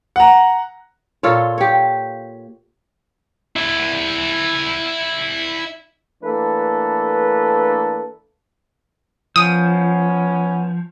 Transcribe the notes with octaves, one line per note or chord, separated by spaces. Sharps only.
F#5 A#5
A#2 F4 A4 C#5
G4 C#5
E4 D5
E3 A3 A#3 D4 A4 B4
F3 B3 C#4 D#6